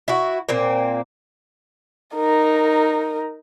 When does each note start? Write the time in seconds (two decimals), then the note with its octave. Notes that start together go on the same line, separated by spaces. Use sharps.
0.08 E4 F#4
0.49 A#2 A#3 C4
2.15 D#4 A#4